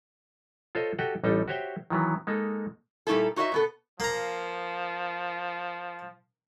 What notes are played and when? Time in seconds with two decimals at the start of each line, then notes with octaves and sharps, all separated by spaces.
0.75 F4 A4 C5 C#5 D#5
0.99 F#4 G4 A4 D#5 F#5 G5
1.24 A1 G3 D#4 A4 G5
1.48 F#4 G4 C5 C#5 E5 G5
1.90 D#3 E3 F#3 B3
2.27 G#3 A#3 D#4 A4
3.07 A#2 G3 A3 D#4 E4 A4
3.36 D#4 F#4 C#5 D#5 E5
3.52 B2 B3 A4
4.00 F3 A#3 A#5